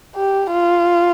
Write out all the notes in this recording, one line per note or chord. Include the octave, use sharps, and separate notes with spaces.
G4
F4